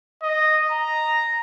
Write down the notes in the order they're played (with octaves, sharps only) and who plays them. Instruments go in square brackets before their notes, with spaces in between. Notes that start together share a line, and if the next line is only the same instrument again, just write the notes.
[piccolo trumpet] D#5
A#5